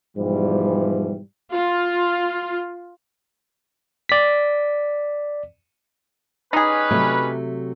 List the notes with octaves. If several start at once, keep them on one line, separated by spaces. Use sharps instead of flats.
G#2 B2 E3 F3 G3
F4
D5 B6
G3 C#4 D#4 G#4 B4
C3 F#3 A3